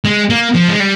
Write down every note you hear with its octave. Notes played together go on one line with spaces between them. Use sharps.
G#3
A#3
F3
G#3
G3